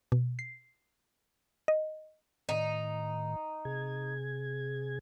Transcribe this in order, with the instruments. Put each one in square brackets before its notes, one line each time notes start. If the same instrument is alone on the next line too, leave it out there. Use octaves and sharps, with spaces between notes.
[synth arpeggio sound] B2
C7
D#5
[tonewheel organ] A2 D#3 [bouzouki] D#4
[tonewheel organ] C3 G#4 G#6